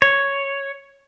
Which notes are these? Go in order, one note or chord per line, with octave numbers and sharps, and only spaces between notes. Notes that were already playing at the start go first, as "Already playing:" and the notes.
C#5